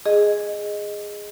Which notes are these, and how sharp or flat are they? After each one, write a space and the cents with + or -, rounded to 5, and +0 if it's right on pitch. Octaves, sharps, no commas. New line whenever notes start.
G#4 +0 D#5 -5